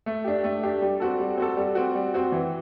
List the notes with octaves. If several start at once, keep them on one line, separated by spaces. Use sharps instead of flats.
A3
D4 G4
A3
D4 G4
G3
C4 F#4 A4
G3
C4 F#4 A4
G3
C4 F#4
G3
C4 F#4
E3